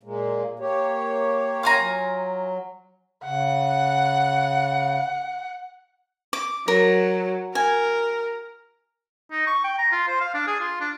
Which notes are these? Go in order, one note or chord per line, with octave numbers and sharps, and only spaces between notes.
A#2 G#3 A#3
A#3 G4 C#5
F4 G#5 A#5
F#3
C#3 F#5
D6
F#3 A#4
A#4 G#5
D#4
C#6
G5
A#5
F4
C5
F5
D4
G#4
F4
D4